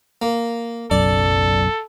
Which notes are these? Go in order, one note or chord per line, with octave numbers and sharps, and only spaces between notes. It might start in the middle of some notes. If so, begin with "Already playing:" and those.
A#3
F#1 B1 F#2 A4 D5